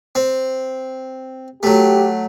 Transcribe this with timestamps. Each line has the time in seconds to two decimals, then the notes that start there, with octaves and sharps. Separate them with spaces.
0.15 C4
1.63 F#3 A3 G4